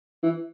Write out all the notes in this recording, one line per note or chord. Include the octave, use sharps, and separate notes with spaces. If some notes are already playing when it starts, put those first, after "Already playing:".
E3